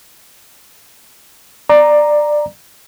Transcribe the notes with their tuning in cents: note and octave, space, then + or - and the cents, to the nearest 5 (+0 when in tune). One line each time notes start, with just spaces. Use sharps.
D5 +15 A#5 +0